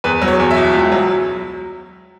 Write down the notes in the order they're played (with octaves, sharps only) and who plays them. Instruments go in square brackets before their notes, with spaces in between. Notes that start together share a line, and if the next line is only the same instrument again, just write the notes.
[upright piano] E2 B4
F#3
C#5
E2
E5
B2
C#2
F#3